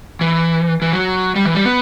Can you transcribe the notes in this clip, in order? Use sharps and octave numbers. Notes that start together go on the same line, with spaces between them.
E3
E3
F#3
G3
E3
G3
B3